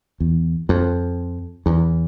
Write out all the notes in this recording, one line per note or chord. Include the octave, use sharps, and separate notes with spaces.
E2
F2
E2